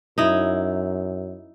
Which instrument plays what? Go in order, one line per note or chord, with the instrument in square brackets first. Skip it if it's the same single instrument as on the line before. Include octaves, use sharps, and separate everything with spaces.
[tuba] F#2 [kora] D#4 E4